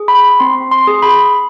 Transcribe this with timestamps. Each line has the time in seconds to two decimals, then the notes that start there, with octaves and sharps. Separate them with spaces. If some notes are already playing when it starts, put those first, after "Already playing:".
Already playing: G#4
0.08 B5
0.40 C4 C6
0.71 C6
0.87 G#4
1.02 B5